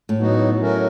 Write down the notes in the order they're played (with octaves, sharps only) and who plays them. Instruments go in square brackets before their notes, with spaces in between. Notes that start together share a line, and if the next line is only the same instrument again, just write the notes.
[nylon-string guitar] A2
[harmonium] F#3 B3 D#4 F#4
F#3 A3 C#4 F#4 A#4